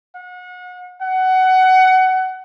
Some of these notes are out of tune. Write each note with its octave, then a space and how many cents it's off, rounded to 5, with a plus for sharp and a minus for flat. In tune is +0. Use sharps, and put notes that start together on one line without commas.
F#5 -35
F#5 +20